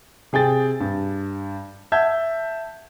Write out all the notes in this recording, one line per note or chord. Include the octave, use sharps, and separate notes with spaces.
C3 G#4 G5 A6
G2
E5 F#5 A5 G6 G#6